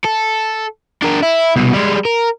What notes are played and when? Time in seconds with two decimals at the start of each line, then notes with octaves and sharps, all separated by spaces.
0.05 A4
1.03 D4 A#4
1.23 E4
1.56 C2 B2
1.74 G3 G#3
2.05 A#4